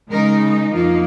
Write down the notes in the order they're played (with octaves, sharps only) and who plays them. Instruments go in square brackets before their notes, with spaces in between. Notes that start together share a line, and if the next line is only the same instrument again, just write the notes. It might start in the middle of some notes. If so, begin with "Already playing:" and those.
[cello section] C#3 G#3 D#4 A#4
F2 F3 A#3 D#4 F4